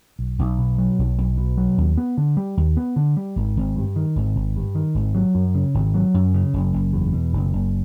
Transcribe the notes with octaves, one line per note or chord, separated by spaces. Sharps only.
B1
B1
B2
F#3
B1
B1
B2
F#3
D#2
B3
D3
G3
D#2
B3
D3
G3
G#1
G#1
G2
D#3
G#1
G#1
G2
D#3
G#1
F#3
F#2
C#3
G#1
F#3
F#2
C#3
F#1
F#1
E2
B2
F#1
F#1